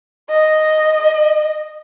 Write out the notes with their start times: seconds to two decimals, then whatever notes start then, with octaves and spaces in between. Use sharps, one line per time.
0.29 D#5